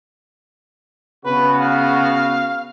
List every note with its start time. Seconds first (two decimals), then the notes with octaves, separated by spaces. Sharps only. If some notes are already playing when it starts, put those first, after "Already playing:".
1.26 C#3 B3 F#4 B4
1.61 F5